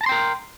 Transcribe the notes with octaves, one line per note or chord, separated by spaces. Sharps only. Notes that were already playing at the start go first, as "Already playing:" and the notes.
A#4 G5 A5 A#5 C6